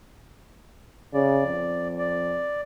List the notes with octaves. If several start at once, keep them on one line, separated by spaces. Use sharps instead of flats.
C#3 D5
F2
D5